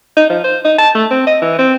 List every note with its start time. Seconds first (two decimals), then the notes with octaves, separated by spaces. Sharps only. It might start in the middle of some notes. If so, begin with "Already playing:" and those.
0.17 D#4
0.30 F3
0.44 C5
0.65 D#4
0.78 A5
0.95 A3
1.11 C4
1.27 D#5
1.42 E3
1.59 C4